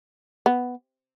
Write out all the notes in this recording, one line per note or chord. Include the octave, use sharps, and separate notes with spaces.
B3